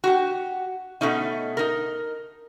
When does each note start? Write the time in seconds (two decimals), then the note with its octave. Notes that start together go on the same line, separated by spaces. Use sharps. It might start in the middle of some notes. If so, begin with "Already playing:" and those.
0.04 F#4 G4
1.01 B2 A3 C#4 D#4
1.57 D#4 A#4